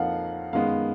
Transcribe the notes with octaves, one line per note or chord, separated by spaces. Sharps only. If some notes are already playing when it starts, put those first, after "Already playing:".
Already playing: F2 F3 A#3 D#4 F5 F#5
F#2 D#3 G#3 B3 F5